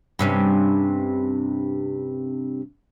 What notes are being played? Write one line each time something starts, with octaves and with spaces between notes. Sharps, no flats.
G2 C3 C#4